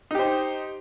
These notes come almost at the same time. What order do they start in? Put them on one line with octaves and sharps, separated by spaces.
D#4 G4 C5